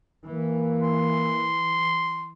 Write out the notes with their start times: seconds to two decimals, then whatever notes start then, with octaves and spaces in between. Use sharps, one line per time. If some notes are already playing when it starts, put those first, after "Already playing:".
0.26 E3 A#3
0.83 C6